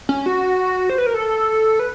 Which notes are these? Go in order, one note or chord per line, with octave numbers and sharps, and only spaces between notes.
C#4
F#4
C5
B4
A#4
A4
B4